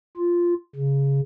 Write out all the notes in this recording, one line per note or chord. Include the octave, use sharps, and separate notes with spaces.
F4
C#3